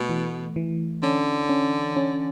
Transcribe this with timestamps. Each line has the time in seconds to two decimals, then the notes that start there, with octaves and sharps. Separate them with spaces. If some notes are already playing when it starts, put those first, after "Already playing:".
Already playing: B2 A3
0.09 E3
0.56 E3
1.03 D3 C#4
1.49 C#4
1.96 C#4